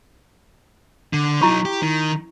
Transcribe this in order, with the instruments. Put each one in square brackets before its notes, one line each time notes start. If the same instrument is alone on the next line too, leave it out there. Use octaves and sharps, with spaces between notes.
[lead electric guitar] D3
[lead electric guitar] F#3 D#4 [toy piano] E4 A#5 C#6
[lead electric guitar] G4
D#3